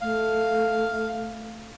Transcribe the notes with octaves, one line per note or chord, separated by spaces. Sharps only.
A3 F5